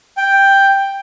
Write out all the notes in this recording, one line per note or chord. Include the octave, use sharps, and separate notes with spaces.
G5